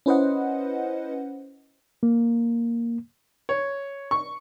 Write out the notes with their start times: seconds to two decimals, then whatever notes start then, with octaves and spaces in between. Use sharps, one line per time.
0.06 C#4 E4 B4 C5 D#5 F#5
2.03 A#3
3.49 C#5
4.11 C#6